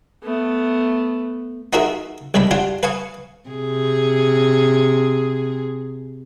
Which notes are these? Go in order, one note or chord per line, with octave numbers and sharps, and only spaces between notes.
A3 B3
D#4 F4 F#4 G#4 A#4 E5
C2 G3 G#3 D4 B5
D4 F4 G4 F#5 G#5
B4 F5 G#5 C#6 D#6
C3 G#4